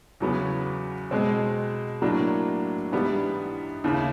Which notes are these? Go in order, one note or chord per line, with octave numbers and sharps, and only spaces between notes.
E2 C#3 F#3 B3
B2 G#3 C4
A2 F#3 A#3 D4
G#2 E3 G3 B3 D4
D#2 C#3 E3